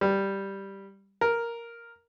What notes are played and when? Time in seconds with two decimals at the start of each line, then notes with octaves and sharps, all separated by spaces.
0.01 G3
1.21 A#4